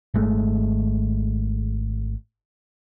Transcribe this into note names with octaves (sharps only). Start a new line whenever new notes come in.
G#1 G#3 A3